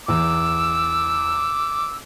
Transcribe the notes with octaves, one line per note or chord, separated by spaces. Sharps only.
E2 D6 E6